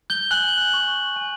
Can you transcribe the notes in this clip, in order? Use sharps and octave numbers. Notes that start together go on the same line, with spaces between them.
G6 G7
G#5 F#6 F#7
C#6 F#6
G#5